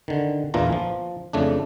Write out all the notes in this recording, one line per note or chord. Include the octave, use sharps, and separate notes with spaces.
D3 D#3
E2 A#2 E3 D4 F4 A#5
F3
F2 C#3 A3 D4